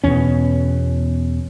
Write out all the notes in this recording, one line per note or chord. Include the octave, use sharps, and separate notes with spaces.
E2 B2 C#4